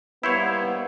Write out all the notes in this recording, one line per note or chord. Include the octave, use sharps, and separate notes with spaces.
G3 A#3 B3 E4 C5 C#5